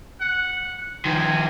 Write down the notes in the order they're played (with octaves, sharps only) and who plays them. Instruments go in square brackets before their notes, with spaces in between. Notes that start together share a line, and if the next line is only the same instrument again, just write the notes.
[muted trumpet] F#5
[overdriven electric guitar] D#3 F3 [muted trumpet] G#5